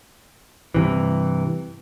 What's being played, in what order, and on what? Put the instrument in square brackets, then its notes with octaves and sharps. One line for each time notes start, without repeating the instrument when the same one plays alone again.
[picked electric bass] G2 C3 E3